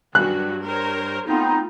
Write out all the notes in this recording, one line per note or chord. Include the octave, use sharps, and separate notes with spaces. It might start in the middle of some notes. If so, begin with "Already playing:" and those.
G2 F#3 F#4 F#6
A#4 C5 C#5
A3 B3 C4 D#4 F4